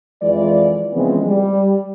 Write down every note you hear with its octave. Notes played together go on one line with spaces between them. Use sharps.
F2 E3 G#3 F4 D5
C#3 E3 F3 G#3 B3 C4
G3